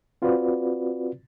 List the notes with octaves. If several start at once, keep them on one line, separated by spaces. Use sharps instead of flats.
C4 F4 F#4 B4 D5